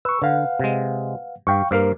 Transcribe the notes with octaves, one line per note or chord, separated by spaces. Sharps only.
B4 C#6 E6
D3 B4 F5 F#5
C3 G#3
G2 F5 G5 C#6
G2 A#3 A#4 C5 F5